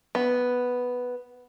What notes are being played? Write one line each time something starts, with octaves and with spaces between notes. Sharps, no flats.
B3